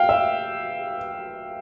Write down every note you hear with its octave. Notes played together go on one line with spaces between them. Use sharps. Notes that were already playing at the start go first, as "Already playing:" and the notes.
Already playing: F5 G5
E5